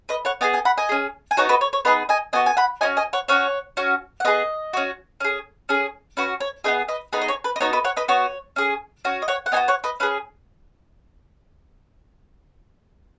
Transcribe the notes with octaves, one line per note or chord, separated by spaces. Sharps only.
B4 D#5
C#5 F#5
B3 G#4 D#5 G#5
D#5 G#5
F#5 B5
D#5 G#5
C#4 G#4
G#5
B3 D#4 F#4 C#5 F#5
B4 D#5
C#5
C#5
B3 D#4 G#4 B4 D#5
D#5 G#5
B3 F#4 D#5 G#5
G#5
F#5 B5
C#4 F#4 D#5 G#5
D#5 G#5
C#5 F#5
C#4 F#4 C#5 F#5
C#4 F#4
F#5
B3 G#4 B4 D#5
C#4 F#4
C#4 G#4
C#4 G#4
C#4 F#4 B4
C#5
B3 D#4 G#4 B4 D#5
B4 D#5
B3 D#4 G#4 B4
D#5
C#5
B4
D#5
B3 D#4 F#4 C#5
B4 D#5
C#5 F#5
B4 D#5
B3 F#4 C#5
C#4 G#4
C#4 F#4
D#5
C#5 F#5
F#5
B3 D#4 F#4 D#5 G#5
C#5 F#5
B4 D#5
C#4 G#4 B4